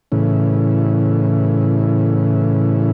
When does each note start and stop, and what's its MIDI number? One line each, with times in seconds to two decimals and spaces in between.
0.12 2.91 45
0.12 2.91 49
0.12 2.91 52